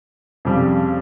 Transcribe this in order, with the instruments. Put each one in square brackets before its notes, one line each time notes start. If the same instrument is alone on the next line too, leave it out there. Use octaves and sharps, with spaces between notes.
[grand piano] F2 C#3 G3